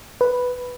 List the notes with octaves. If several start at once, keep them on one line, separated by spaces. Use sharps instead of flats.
B4